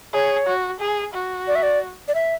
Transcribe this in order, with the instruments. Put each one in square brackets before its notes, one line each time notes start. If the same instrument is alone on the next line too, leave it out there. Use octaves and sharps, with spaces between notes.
[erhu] G#4 [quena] C#5
[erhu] F#4
G#4
F#4
[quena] D5
E5
D5
D5
E5